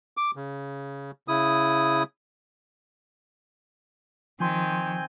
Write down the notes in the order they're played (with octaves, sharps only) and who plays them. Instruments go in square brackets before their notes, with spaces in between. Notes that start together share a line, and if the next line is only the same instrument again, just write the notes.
[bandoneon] D6
C#3
C#3 E4 D#6
[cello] D#3 [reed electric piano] F3 C6 [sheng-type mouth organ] C4 G#5 G6